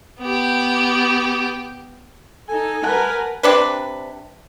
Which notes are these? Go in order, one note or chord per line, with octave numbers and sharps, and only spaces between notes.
B3 G4
D#4 A4 G#5
G3 A#4 B4 F#5 A5 F#6
C3 D4 B4